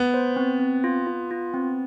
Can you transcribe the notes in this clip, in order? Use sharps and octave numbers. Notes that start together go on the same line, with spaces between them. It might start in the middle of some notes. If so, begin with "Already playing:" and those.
Already playing: B3
C5
C4
C4
F4
F4
F4
C4